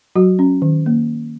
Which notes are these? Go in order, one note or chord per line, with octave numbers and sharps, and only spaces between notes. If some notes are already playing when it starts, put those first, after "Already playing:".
F#3 F#4
C#4
D#3
A#3